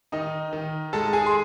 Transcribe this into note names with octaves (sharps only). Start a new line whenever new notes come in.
D#3 D#4 D#5
D#3
G#3 A4 A5
G#4 G#5
C6